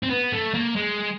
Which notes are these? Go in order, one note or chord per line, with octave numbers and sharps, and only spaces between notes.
C4
B3
A3
A#3
G#3